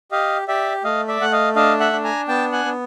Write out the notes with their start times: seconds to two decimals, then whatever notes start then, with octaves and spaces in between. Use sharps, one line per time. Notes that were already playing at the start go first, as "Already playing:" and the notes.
0.12 G4 D#5 F5
0.48 G4 D5 E5
0.84 A3 D#5 F5
1.08 D5 E5
1.20 A3 F#5
1.32 D#5 F5
1.56 D4 D#5 F5
1.80 E5 F#5
1.93 D4
2.04 G#5 A#5
2.28 B3 G5 A5
2.52 F#5 G#5
2.65 B3